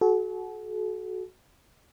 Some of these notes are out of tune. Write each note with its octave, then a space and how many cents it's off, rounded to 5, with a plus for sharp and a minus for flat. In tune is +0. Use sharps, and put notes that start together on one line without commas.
F#4 +0 A4 -40